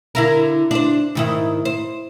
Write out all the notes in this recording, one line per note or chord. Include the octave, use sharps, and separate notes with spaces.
D3 E4 A#4
D4 C5
G#2 D#3 E4
C5